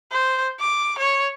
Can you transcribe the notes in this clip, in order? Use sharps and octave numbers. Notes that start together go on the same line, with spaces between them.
C5
D6
C#5